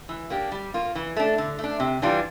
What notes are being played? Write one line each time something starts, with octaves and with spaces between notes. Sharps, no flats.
E3
A#3 D4 G4
G3
A#3 F4
E3
A3 D4
D3
A3 D4
C3
E3 G3 D4 F4